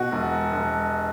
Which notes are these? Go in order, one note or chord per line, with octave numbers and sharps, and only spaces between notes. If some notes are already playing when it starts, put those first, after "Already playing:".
Already playing: B2 F#4
E1
E1